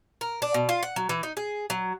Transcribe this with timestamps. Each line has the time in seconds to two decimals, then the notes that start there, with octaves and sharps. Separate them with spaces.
0.21 A#4
0.42 D4
0.54 B2
0.69 F4
0.83 F#5
0.96 F#3
1.09 E3
1.23 D#4
1.37 G#4
1.70 F#3